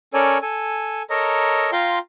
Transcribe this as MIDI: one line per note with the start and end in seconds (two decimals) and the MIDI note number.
0.14 0.38 61
0.14 0.38 69
0.14 0.38 70
0.14 0.38 73
0.14 0.38 74
0.14 0.38 80
0.42 1.02 69
0.42 1.02 80
1.10 1.71 69
1.10 1.71 70
1.10 1.71 73
1.10 1.71 75
1.10 1.71 82
1.72 1.99 65
1.72 1.99 77
1.72 1.99 79
1.72 1.99 82
1.72 1.99 84